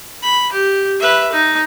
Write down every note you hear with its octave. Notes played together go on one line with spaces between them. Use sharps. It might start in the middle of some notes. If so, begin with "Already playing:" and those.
B5
G4
B4 E5
D#4